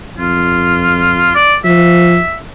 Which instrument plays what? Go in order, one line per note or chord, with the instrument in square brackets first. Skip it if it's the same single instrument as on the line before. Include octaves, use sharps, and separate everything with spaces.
[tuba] F2 [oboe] F4
[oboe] D5
[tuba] F3 [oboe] E5